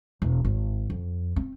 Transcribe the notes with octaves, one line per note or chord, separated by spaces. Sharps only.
E1
G#1
F2
C4